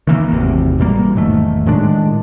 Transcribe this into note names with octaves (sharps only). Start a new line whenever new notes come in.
D#3 E3 A#3
G#1 E2 A2 C3
A1 B2 G3 A#3
E1 G#2 D#3 A3
A2 D#3 G#3 D4